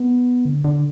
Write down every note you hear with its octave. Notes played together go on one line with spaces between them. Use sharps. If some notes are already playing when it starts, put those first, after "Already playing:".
Already playing: B3
D3
D3